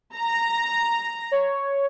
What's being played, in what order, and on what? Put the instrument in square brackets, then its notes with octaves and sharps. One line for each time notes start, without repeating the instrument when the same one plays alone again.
[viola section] A#5
[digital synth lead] C#5